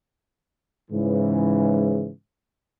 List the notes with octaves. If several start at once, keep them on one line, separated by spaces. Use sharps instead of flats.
G#2 C#3 E3